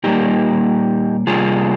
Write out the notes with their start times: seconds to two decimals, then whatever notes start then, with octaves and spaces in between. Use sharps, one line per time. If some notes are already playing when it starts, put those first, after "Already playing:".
0.04 A#2 G3 A#3 D#4 G4
1.27 C3 G3 A#3 F4 G#4